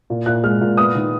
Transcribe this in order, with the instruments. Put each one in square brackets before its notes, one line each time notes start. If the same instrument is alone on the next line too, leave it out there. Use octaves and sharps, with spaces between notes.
[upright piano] A#2
A#2 F#6
G#3 F6
A#2
B3 D#6
D#3